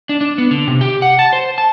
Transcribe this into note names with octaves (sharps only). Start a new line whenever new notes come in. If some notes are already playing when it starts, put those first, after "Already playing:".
D4
D4
B3
D3
C3
G4
F#5
A5
C5
A5